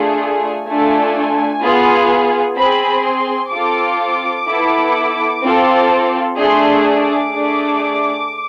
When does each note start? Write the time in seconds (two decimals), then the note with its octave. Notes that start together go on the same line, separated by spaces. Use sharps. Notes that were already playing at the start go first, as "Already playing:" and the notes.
Already playing: A3 D4 F4 G#4
0.20 G#5
0.67 A3 D4 F4 A4 G#5
1.62 B3 F4 G#4
2.57 C4 G#4 B5
3.05 C6
3.52 C4 F4 A4 D6
4.47 B3 E4 A4
5.42 C4 F4 A4
6.37 A3 D4 G#4 C6
7.00 D6
7.32 A3 D4 G#4